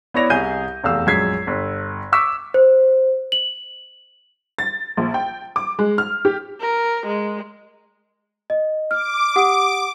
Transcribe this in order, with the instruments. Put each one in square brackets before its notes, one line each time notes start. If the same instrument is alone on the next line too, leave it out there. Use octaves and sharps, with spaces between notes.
[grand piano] B3 E4 C#5 D5 A#6 F7
C2 G#4 E5 G#5 G6 D#7
F1 E2 F5 E6
A#1 F#2 G#3 G#6 B6 C7
G1
C#6 D6 E6 B6
[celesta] C5
F#7
[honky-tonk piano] A6
A#1
G5
D6
G#3
F6
G4
[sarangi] A#4
G#3
[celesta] D#5
[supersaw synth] D6 [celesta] F6
[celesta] G4 F#5 D#6